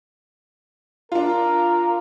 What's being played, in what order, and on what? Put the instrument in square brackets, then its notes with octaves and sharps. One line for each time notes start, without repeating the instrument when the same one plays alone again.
[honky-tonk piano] D4 F4 [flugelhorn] A#4